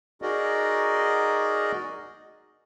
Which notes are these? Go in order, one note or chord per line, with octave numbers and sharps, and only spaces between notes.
D#4 F#4 G#4 A#4 D5 D#5